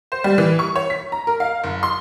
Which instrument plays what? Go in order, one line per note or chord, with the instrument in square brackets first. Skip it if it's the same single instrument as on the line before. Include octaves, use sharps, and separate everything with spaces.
[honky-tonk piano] C5
G3
E3
C#6
C#5
B6
A#5
A#4
F5
F#1
C6